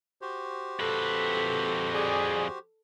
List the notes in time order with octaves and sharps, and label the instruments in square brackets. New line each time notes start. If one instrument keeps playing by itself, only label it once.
[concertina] F#4 G4 C5
[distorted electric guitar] F2 B4 [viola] A4
[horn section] G#4 D5